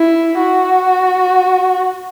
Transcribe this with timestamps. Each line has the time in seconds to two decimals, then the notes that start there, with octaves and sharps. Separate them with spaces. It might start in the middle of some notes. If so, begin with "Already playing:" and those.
Already playing: E4
0.39 F#4